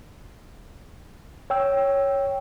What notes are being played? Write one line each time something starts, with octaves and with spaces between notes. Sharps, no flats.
C#5 G5 E6